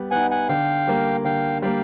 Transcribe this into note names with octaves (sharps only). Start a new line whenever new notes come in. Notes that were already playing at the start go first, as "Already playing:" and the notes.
Already playing: G3 B3
B3 D#4 F#5 G#5
F#5 G#5
D3 F5 G5
G3 A#3
D3 F5 G5
G3 A#3 F5 G5